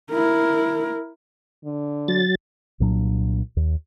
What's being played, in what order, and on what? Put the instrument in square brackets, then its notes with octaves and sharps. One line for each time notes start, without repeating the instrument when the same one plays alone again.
[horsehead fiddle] E4 A#4
[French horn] D3
[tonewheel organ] F#3 A6
[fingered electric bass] C2 A#2 F#3 D4
D#2